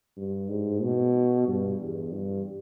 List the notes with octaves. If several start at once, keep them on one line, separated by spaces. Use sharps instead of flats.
G2
G#2
B2
G2
E2
G2